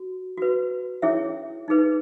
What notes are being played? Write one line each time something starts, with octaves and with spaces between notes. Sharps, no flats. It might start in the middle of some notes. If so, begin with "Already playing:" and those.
Already playing: F#4
F#4 B4
C#4 E4 G#4 C#5 E5
D#4 G#4 B4